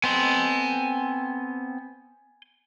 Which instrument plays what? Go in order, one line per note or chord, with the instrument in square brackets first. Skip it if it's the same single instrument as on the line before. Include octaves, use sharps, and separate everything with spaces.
[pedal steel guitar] B3 C4 A4 [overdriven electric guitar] G#5 C6